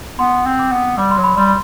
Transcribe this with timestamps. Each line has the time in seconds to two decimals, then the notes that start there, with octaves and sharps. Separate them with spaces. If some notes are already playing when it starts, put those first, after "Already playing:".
0.19 B3 C6
0.46 C4
0.59 D6
0.72 B3
0.97 G3 D6
1.11 C6
1.18 F#3
1.24 B5
1.37 G3 C6